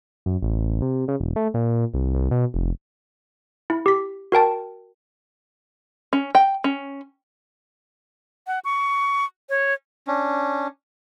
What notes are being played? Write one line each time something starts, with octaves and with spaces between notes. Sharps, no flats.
F#2
A1
C3
C#3
E1
A3
A#2
C2
C2
B2
F1
E4
G4 B6
F#4 A#4 G5 A5
C#4
G5
C#4
F#5
C#6
C#5
C#4 D4